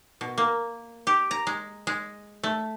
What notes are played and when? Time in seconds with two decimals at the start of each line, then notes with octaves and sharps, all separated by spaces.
0.21 B2
0.38 A#3
1.07 G4
1.31 A#5
1.47 G#3
1.87 G#3
2.43 A3